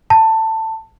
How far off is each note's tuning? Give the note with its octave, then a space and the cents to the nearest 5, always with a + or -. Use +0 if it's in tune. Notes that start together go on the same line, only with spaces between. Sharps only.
A5 +15